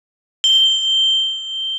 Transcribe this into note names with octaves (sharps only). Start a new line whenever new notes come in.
G7